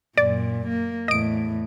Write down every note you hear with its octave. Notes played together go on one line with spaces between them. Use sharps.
F#2 A#2 D5
A#3
E2 A2 D#5 D7